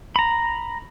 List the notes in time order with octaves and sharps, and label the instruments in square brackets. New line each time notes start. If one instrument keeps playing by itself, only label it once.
[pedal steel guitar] A#5 B5